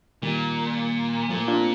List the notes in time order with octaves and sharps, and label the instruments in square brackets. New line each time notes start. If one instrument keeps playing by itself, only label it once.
[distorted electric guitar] A#2 [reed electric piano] D#3 G3
[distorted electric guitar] A#2 [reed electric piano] F3 A3
[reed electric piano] D4 F4
C4